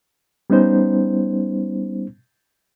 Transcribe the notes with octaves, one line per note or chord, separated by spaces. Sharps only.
G3 B3 C#4 D#4 C5